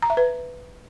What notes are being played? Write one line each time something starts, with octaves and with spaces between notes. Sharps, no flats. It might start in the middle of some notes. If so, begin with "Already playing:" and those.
A#5
E5
B4